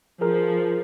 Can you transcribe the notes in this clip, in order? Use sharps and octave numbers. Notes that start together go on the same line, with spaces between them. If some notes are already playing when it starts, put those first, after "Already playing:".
F3 G#4 A#4